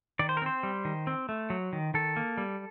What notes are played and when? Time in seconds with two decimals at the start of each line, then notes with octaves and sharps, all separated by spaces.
0.19 D#3 D5
0.29 C5
0.37 A#4
0.42 C4 C5
0.63 G3
0.85 D#3
1.07 C4
1.29 A3
1.50 F#3
1.73 D#3
1.94 D#3 A4
2.16 A#3
2.38 G3